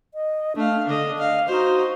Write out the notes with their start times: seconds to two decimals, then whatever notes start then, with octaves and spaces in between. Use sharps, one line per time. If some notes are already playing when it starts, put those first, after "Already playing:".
0.14 D#5
0.56 A3 D4 F5
0.87 D3 D4 D#5
1.19 D#5 F5
1.48 D#4 F#4 C5